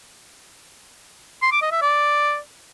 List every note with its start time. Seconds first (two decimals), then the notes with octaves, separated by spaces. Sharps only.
1.42 C6
1.52 D6
1.62 D#5
1.72 E5
1.82 D5